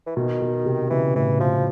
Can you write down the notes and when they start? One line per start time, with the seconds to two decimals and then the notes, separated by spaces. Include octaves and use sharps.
0.06 E3
0.16 B2 D#3
0.42 B2
0.66 C3
0.90 C#3 E3
1.15 A2 E3
1.39 B2 F3